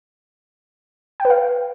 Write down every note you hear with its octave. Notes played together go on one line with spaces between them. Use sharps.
G5
B4
F5